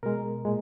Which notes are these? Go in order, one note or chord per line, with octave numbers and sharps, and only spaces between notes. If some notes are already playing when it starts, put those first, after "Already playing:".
B2 G#3 A#4
A#2 G#3